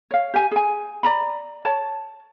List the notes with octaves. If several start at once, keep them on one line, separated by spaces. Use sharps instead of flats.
C#5 F5
G4 G#5
G#4 G#5
D5 A#5 B5
C#5 A5